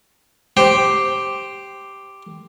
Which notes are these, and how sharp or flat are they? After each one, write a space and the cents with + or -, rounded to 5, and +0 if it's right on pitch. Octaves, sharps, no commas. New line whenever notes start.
G4 +0 C5 +0